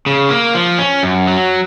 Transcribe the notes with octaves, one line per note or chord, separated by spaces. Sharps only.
C#3
A#3
F3
C#4
F#2
F#3